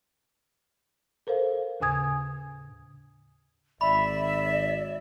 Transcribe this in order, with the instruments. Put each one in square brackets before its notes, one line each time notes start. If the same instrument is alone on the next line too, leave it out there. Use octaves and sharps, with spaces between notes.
[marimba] A4 A#4 C5 F5
D#2 A2 C#3 G#5 D#6 G#6
[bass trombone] G#1 [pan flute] D5 [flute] E5 [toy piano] B5